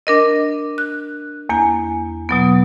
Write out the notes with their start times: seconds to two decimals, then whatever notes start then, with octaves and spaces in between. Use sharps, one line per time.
0.07 D4 A#4 D#5
0.78 F#6
1.49 E2 A#3 G#5
2.29 B2 F#3 B3